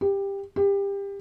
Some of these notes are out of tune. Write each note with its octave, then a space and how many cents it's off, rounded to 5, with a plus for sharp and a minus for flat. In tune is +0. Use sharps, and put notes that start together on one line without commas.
G4 +15
G4 +25